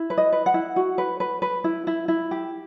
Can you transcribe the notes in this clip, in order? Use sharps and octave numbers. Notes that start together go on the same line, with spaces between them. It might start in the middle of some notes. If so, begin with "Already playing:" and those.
Already playing: E4
B4
D#5
B4
F#5
E4
F#4
B4
B4
B4
E4
E4
E4
G4